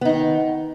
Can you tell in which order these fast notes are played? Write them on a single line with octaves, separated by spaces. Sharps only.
B3 D#4 D#3